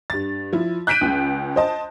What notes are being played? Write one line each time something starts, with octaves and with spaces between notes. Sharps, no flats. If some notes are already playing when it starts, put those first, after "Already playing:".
G2 A6
F3 E4
F#6 G6 B6 D7 D#7
C#2 C#3
C5 D#5 A5